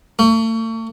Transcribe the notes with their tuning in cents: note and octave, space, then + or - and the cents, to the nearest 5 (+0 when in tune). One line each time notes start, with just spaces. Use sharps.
A3 +40